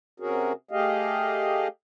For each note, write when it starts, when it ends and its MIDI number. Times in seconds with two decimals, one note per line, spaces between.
0.20 0.53 48
0.20 0.53 61
0.20 0.53 66
0.20 0.53 68
0.20 0.53 70
0.71 1.68 57
0.71 1.68 67
0.71 1.68 68
0.71 1.68 75
0.71 1.68 77